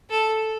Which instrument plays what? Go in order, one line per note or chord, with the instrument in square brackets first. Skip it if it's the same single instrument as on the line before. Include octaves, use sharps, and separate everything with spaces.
[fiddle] A4